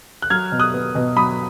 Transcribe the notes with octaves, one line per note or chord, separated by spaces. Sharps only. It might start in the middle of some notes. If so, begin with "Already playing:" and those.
F#6
F#3 F6 G#6
B2
D#6 F#6
B3
B2
F#3 B5 D#6